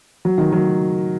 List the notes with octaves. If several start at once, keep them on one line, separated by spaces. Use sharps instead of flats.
F#3
D#3
F#3